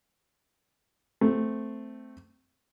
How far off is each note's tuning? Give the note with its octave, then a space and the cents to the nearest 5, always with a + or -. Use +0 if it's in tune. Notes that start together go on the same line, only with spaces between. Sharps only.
A3 +0 C4 -10